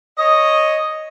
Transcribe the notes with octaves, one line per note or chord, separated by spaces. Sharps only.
C#5 D#5